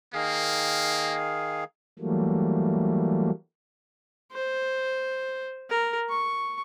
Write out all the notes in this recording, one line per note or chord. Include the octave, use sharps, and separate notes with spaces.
D#3 A#3 G#4 F5
E3 F#3 G3 A3 A#3
C5
A#4
C#6